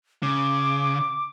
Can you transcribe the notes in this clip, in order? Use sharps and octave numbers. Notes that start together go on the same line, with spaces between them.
C#3 D6